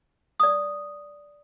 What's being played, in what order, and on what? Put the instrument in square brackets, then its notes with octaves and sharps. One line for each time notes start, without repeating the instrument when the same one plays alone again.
[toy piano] D5 D#6